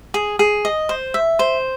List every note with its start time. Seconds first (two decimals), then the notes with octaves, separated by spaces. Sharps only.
0.14 G#4
0.39 G#4
0.65 D#5
0.89 C5
1.14 E5
1.39 C5